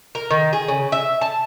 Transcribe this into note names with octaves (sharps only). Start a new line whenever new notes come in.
A#4
D#3
G#4
C#3
E5
A5